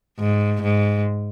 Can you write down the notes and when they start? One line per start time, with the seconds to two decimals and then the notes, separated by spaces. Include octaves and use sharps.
0.19 G#2
0.62 G#2